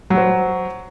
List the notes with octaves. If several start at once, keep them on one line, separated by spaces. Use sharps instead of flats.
F#3 F#4 C5